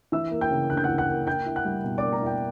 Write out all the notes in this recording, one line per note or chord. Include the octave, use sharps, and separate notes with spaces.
E3 E5 E6
A#3
G5 G6
C#3
D2 F#6
G6
E3 F#5 F#6
F#5 F#6
A#3
A#3 G5 G6
E4
F#5 F#6
G3
B2
A#3 D5 D6
A#4 A#5
E4 G5